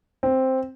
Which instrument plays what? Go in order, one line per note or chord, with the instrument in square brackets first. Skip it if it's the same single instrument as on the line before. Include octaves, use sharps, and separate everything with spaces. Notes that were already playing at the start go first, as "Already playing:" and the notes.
[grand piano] C4